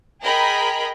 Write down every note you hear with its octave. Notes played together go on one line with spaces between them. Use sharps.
G#4 A#4 D#5 G5 B5